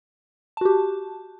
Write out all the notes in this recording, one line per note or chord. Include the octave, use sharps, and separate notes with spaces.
F#4 G4 A5